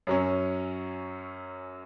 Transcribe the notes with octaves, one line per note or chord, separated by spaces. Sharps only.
F#2 F#3 C#4